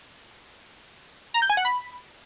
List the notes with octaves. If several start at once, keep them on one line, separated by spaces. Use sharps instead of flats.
A#5
G6
G#5
F#5
B5